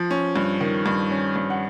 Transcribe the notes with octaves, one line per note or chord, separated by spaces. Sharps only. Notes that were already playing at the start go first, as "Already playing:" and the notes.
Already playing: F3
C#4
G2
D#3
G2
C#4
G2
F#5